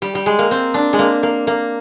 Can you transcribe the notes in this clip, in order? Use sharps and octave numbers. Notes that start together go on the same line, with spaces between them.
G3
G3
G#3
A#3
C4
D4
G#3
A#3
A#3
A#3